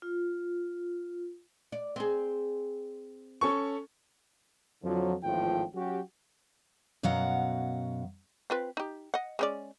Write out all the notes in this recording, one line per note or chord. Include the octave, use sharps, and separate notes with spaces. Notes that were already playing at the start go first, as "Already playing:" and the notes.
F4
D5
C4 G#4
C#4 A4 C#6
F2 D3 F3 F#3
G#1 E2 A2 F3 F4 G5
F#3 C#4 F#4 G4
F#2 B2 F#3 F5 F#5 A#5
C4 F4 B4
D#4 G4
D#5 F#5
G#3 C#4 D5